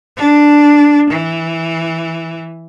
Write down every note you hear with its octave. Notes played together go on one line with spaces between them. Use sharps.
D4
E3